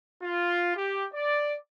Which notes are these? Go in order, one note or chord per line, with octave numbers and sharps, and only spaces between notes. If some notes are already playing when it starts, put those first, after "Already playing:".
F4
G4
D5